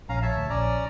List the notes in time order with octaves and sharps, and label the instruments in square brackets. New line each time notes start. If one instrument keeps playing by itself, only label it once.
[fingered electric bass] A#1 [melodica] C#4 F5 A#5
[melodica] C#5 E5 A5
[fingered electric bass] D2
[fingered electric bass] A#1 [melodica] C#4 D5 A#5